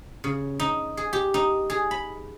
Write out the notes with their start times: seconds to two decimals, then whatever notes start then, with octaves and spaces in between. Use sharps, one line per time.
0.24 C#3
0.60 D#4
0.97 G#4
1.13 G4
1.34 D#4
1.70 G#4
1.91 B5